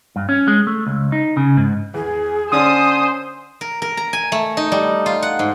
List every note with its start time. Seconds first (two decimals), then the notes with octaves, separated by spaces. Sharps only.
0.16 G2
0.29 C#4
0.48 G#3
0.67 A3
0.87 C#2
1.12 D#4
1.37 C#3
1.57 G#2
1.94 E2 G#4
2.52 D3 C#4 D4 C5 G#5 D#6
3.61 A#4
3.82 A#4
3.97 A#5
4.13 G#5
4.32 A3
4.57 D#4
4.72 G3
5.06 F4
5.23 F#5
5.39 G#2